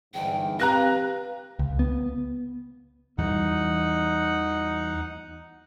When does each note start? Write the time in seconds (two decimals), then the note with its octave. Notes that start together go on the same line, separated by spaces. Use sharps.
0.14 G1 E2 G#2 G5
0.60 C4 G4 B4 F5 A#5 F#6 A#6
1.59 C#2
1.79 B3
3.18 E2 E3 G3 D#4 F#5